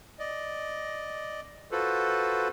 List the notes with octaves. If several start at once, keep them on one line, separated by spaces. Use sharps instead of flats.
D5 D#5
F4 F#4 A4 B4 C5